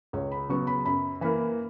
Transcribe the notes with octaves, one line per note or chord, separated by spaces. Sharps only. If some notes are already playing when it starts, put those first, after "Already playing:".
C#2 C#5
B5
C#3 F#3 B3 C#6
B5
F#2 B5
E3 A#3 B5